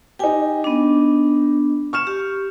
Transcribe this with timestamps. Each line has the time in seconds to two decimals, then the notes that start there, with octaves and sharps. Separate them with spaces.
0.19 D#4 G4 G5 G#5
0.64 B3 D4
1.93 C#6 F6 E7
2.07 G4